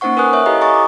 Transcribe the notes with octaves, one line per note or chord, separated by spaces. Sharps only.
A#3 C#4 D#4 C5 F#5 C#6
A#4 B4 G#5 D#6 F#6
C#5 E5
E4 G4 A4 D#5 F5 A#5
G#5 A#5 C#6 D#6 A6
D6